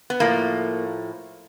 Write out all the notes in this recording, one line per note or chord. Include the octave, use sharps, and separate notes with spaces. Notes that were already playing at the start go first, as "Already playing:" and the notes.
B3
A2 F3 A3 A#3